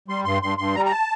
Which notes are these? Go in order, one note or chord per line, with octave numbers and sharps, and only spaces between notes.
G3 C6
G2 C6
G2 C6
G2 C6
G3 A#5
A#5
A5